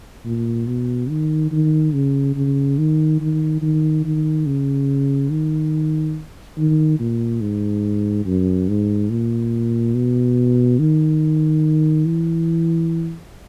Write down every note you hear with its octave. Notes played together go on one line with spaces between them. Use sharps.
A#2
B2
D#3
D#3
C#3
C#3
D#3
D#3
D#3
D#3
C#3
D#3
D#3
A#2
G#2
F#2
G#2
A#2
B2
D#3
E3